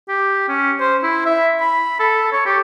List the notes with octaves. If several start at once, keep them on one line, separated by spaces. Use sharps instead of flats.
G4
C#4
C5
E4
E5
B5
A4
C#5
G4